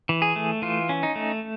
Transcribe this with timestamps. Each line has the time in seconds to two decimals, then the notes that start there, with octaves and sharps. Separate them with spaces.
0.09 E3
0.22 G#4
0.36 A3
0.62 E3 F4
0.89 C#4
1.03 D#4
1.16 A3